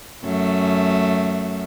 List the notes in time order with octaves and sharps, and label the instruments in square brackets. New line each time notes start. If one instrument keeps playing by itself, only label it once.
[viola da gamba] F#2 A3